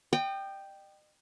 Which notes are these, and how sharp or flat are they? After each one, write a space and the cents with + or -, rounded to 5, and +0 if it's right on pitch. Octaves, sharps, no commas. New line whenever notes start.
D#5 -40 G5 +0